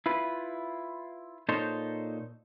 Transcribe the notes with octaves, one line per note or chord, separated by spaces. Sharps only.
E4 F4 B4
A#2 D#4 A4 C5 C#5